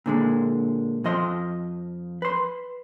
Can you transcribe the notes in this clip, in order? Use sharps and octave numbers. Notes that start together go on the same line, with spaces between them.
A#2 D3 G#3
F2 F3 D#5 C6
B4 C6